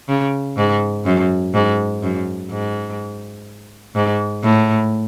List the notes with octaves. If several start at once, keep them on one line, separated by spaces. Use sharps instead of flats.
C#3
G#2
F#2
G#2
F#2
G#2
G#2
A2